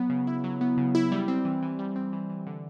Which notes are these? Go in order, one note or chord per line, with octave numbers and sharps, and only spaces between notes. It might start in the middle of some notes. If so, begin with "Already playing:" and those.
Already playing: F#3 B3
C#3
E4
F#3
B3
C#3
E4
G3
C4
E3
E3
G3
C4
E3
E3
D3